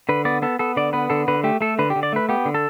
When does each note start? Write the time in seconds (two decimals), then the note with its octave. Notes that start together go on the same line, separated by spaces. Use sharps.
0.09 D3 B4
0.25 B3 D5
0.42 B3 A4
0.59 B3 A4
0.77 D3 D5
0.93 B3 B4
1.10 D3 A4
1.28 D3 B4
1.44 A3 G4
1.61 A3 A4
1.79 D3 B4
1.90 G4
1.96 D3
2.03 D5
2.13 A3 B4
2.29 B3 G4
2.45 D3
2.55 A4